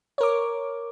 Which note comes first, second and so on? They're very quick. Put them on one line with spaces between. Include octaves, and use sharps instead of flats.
C#5 A#4 D6